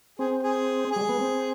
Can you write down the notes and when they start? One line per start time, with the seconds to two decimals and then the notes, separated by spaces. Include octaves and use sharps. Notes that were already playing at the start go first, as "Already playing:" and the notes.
0.19 C4 G#4
0.43 G#4
0.91 G3 G#4
1.01 G#3
1.09 B3
1.19 C4